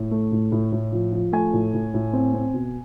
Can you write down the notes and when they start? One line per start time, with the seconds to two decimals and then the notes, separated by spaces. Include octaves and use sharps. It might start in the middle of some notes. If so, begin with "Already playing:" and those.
Already playing: A2
0.11 A3
0.32 A2
0.52 A2
0.72 A2
0.92 F3
1.12 F3
1.32 A3 G#5
1.53 A2
1.74 A2
1.94 A2
2.13 C4
2.34 C4
2.54 B2